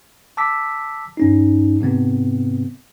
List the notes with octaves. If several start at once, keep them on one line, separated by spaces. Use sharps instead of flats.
A5 D6 E6 B6
G2 C#4 D#4
G#2 C3 B3 C4